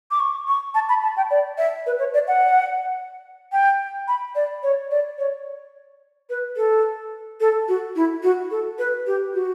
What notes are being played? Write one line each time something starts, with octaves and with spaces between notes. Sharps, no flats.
D6
C#6
C#6
A5
B5
A5
G5
D5
E5
B4
C#5
D5
F#5
G5
B5
D5
C#5
D5
C#5
B4
A4
A4
F#4
E4
F#4
A4
B4
G4
F#4